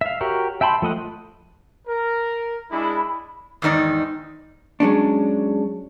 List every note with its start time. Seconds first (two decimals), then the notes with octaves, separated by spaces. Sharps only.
0.01 E5 F5
0.21 F#4 G4 A#4 C#5
0.61 E5 G5 A5 B5 C6
0.82 F3 A3 D#5 F#5
1.87 A#4
2.70 G#3 D4 E4 B5
3.62 E2 G#2 D#3 D#4 D5
4.80 F#3 G#3 C#4 D4